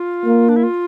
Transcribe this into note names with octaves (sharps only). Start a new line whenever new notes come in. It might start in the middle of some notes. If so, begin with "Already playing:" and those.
Already playing: F4
A#3
D4
E4
F4